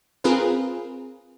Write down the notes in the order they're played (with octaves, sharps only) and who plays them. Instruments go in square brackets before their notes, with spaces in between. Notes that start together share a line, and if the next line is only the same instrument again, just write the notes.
[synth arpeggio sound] C4 F4 G#4 A#4 B4